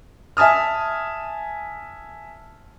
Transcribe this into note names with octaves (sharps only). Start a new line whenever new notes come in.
E5 G#5 A5 D#6 F6